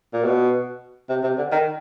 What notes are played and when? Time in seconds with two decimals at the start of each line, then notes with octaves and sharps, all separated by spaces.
0.13 A#2
0.24 B2
1.09 C3
1.23 C3
1.38 D3
1.52 D#3